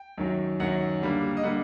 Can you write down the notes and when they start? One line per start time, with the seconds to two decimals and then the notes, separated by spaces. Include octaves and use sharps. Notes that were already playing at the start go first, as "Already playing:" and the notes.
Already playing: G5
0.18 F#2 D#3 F#3
0.60 F#2 D#3 F#3 F#5
1.02 D3 G3 A#3
1.37 D#5
1.43 D3 G3 A#3 F#5